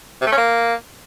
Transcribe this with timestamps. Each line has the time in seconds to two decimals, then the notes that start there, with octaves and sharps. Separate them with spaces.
0.21 C3
0.27 A3
0.32 C#4
0.37 A#3